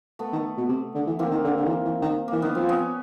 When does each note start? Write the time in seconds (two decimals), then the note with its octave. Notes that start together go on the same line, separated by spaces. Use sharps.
0.19 A3 B3
0.32 D#3
0.57 B2
0.69 C3
0.95 D3
1.07 E3
1.19 E3 A#3 C4
1.31 D#3
1.45 D3
1.57 D3
1.65 D#3
1.69 E3
1.85 E3
2.02 D#3
2.28 E3 A#3
2.42 D#3 B3
2.55 F3 C4
2.69 B3 C#4